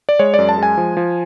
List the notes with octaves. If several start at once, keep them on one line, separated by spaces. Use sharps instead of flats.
D5
G#3 C#5
F#2 D5
A5
G#3 G#5
F3
F3